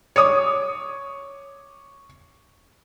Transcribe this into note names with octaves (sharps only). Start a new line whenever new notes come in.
C#5 D6 D#6